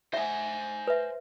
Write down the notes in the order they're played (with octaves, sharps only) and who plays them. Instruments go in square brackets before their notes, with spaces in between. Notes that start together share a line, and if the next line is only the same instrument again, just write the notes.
[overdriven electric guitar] C5 G#5 [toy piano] E5 F#5
[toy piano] B4 E5